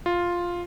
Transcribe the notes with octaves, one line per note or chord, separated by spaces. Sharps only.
F4